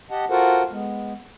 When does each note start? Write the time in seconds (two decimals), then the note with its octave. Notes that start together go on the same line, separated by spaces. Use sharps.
0.11 G4 D#5 F#5 A5
0.30 F4 F#4 A4 A#4 C5 F#5
0.71 G#3 B3